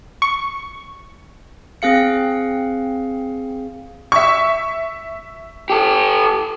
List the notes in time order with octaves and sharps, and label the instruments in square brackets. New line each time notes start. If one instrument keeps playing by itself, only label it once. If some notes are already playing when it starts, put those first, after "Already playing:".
[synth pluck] C#6
[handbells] C4 G#4 F5 C#7
[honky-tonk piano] E5 C#6
[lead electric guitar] G4 A4